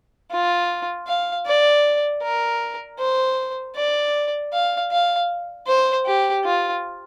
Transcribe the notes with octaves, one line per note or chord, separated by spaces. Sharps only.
F4
F5
D5
A#4
C5
D5
F5
F5
C5
G4
F4